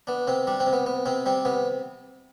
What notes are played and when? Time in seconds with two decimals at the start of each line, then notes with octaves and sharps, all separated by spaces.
0.07 B3 D4
0.27 C3 C4
0.47 G3 D4
0.60 C4
0.66 C3
0.73 B3
0.86 B3
1.06 C3 C4
1.26 G3 C4
1.45 C3 B3